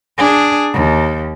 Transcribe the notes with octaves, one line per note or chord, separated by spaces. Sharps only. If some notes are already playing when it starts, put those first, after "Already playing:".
D4 G#4
D#2